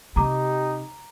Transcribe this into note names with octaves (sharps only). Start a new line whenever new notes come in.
C3 D#4 G4 A#5 D6